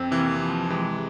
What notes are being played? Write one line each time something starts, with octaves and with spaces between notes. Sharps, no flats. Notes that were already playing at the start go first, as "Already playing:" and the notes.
Already playing: F2 C4
C3 E3 A#3
F3
C3 E3 G#3